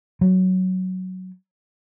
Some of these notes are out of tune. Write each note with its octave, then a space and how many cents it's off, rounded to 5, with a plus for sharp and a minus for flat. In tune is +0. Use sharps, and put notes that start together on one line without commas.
F#3 +5